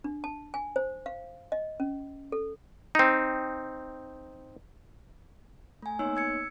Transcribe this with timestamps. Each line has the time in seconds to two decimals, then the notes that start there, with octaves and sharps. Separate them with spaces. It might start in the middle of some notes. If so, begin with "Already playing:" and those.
0.04 D4
0.24 A5
0.54 G#5
0.76 C5
1.06 F5
1.52 D#5
1.80 C#4
2.32 A4
2.95 C4 D#4
5.82 A3 G#5
5.99 A#3 B3 D#4 C#5 E6
6.16 E6 G#6 C#7